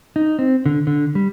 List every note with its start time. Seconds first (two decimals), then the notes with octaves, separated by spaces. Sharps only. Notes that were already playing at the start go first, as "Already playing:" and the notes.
0.16 D#4
0.39 C4
0.66 D3
0.87 D3
1.15 G3